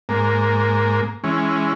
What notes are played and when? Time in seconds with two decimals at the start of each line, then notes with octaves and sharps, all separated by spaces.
0.09 G#2 A#3
1.24 E3 G#3 C#4